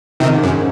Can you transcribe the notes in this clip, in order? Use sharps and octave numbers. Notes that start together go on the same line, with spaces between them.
G#2 C3 D#3
F#2